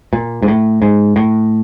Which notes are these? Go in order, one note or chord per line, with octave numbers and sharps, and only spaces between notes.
A#2
G#2
A2
G#2
A2